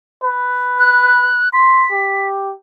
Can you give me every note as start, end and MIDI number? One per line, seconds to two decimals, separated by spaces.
0.23 1.45 71
0.78 1.49 90
1.53 1.86 84
1.53 2.27 95
1.92 2.53 67